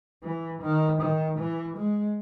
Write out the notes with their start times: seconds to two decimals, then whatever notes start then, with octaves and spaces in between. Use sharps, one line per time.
0.23 E3
0.62 D#3
1.01 D#3
1.38 E3
1.77 G#3